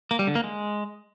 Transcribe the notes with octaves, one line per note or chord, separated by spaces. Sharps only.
A#3
G3
D3
A#3
G#3